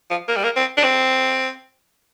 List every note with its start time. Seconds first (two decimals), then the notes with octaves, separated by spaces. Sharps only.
0.10 F3
0.28 A#3
0.36 G3
0.44 A#3
0.56 C4
0.77 D4
0.84 C4